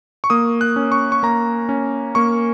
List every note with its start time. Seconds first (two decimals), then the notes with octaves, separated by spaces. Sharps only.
0.24 C#6
0.30 A#3 D#6
0.61 F#6
0.76 C#4
0.92 C#6
1.12 C#6
1.23 A#3 A#5
1.69 C#4
2.15 A#3 C#6